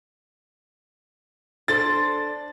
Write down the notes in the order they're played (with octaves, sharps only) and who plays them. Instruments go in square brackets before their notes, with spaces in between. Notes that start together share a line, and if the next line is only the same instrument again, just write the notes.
[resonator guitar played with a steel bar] D4 A4 C5 [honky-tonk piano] A6